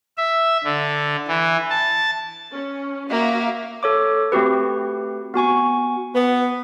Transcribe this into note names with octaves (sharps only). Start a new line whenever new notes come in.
E5
D3
E3
A5
C#4
A#3 F#4 E5 F5
A4 C#5 D6
A3 C4 F#4 G4 B4
B3 F#4 G#5 C#6
B3